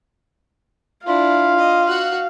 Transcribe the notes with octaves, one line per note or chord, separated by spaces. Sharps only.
D4 E4 F4 F5
D#5
F#4 F#5